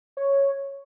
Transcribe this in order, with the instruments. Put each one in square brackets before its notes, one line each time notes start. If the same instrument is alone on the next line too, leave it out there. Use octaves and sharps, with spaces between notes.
[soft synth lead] C#5